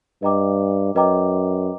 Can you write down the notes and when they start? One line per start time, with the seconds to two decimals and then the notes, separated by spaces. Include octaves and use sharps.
0.22 G2 B4 D#5 G5 A#5 D6
0.95 F#2 B4 D#5 G5 A#5 D6